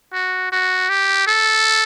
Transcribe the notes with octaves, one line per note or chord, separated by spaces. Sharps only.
F#4
F#4
G4
A4